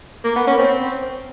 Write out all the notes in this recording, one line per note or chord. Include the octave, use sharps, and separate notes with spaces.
A#3
B3
C#4
C4